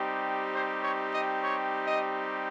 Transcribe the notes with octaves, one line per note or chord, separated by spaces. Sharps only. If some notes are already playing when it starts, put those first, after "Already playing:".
Already playing: G3 C4 D#4 G4
C5
C#5
D#5
C#5
D#5